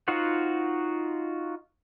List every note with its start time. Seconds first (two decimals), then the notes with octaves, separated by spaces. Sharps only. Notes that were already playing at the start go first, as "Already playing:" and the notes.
0.08 D#4 F4 F#4 C5 F#5